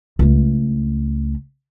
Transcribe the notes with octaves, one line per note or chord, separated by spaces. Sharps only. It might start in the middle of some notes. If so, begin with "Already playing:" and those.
C#2 A3